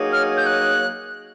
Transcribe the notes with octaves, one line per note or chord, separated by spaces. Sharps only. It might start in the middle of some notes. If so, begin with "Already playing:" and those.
Already playing: F#3 A#3 D#4 G#4 C#5
F6
G6
F#6